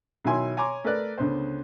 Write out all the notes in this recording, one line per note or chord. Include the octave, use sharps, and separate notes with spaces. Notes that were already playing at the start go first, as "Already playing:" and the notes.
B2 D#3 F#3 E4 G#5 C6
C#5 G#5 A#5 C6 D6
A3 A#4 B4 D5 F#6
C#2 D3 B3 C5